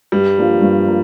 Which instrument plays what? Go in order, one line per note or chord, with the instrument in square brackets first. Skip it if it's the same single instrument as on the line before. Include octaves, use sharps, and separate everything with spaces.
[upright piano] G2 [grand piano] G3
[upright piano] F3 A#3 D4 F4
G2
F3 A#3